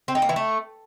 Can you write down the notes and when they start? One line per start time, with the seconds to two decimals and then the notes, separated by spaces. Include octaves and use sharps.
0.08 C4
0.15 D#4
0.22 A#3
0.29 E3
0.36 A3